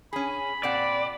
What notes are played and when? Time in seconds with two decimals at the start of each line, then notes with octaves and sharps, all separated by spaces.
0.13 C#4 G#4 B5
0.63 A#2 C4 D5 F#5